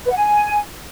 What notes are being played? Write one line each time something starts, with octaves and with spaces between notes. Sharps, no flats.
B4
F#5
G#5